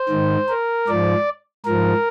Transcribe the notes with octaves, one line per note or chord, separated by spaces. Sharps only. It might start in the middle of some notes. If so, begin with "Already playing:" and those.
Already playing: C5
G#2 D#3
A#4
G#2 F3 D5
G#2 F3 A#4